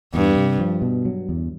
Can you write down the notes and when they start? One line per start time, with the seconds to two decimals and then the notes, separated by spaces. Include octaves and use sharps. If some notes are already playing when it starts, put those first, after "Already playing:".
0.14 E2 G2
0.36 C3
0.59 F3
0.82 B2
1.05 F#3
1.29 E2